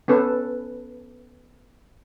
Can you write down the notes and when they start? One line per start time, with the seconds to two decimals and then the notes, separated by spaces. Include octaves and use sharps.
0.08 B3 C#4 A4 B4